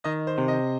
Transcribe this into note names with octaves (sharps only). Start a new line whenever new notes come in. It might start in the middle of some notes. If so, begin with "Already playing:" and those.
D#3 D#5
C5
C3
D#5